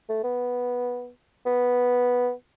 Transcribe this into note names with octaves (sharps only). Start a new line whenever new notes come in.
A3
B3
B3